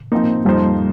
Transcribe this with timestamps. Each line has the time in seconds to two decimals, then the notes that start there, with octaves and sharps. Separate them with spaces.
0.12 F3 A#3 C4 D#4
0.45 F2 F3 G3 D#4 C5